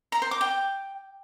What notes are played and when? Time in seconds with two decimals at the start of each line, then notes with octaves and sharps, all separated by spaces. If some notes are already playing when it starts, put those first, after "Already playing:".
0.12 A#5
0.22 C5
0.31 D6
0.41 G5